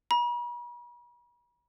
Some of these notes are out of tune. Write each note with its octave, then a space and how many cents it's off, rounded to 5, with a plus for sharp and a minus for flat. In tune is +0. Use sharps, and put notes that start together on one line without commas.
B5 -45